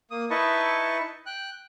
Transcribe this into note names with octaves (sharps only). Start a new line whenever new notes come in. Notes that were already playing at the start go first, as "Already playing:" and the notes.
A#3 D#6
D#4 E4 B4 D#5 A5 C#6
G5 F#6